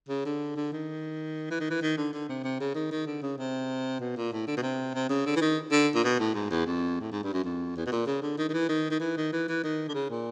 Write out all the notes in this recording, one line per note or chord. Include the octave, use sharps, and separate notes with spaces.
C#3
D3
D3
D#3
E3
D#3
E3
D#3
D3
D3
C3
C3
C#3
D#3
D#3
D3
C#3
C3
B2
A#2
A2
D3
B2
C3
C3
C#3
D3
E3
D#3
D3
A#2
B2
A2
G#2
E2
F2
A2
G#2
G2
F#2
F2
E2
B2
A#2
C#3
D3
D#3
D#3
E3
D#3
D#3
E3
D#3
E3
E3
D#3
D3
C#3
A#2